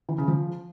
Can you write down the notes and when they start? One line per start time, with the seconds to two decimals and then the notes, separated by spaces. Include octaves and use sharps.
0.09 E3
0.18 C#3
0.28 F3